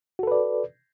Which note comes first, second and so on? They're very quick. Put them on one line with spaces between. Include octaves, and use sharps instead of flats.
F#4 A4 B4 D5